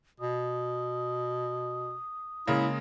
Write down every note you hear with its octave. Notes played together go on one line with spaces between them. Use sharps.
B2 D#6
C#3 G#3 A#3 E4